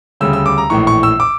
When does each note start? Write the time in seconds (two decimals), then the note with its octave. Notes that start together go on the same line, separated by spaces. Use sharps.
0.21 D2 C#3 G3 E6
0.33 E6
0.46 D6
0.58 A#5
0.70 A#1 A2 E3 C#6
0.87 C#6
1.03 E6
1.20 D6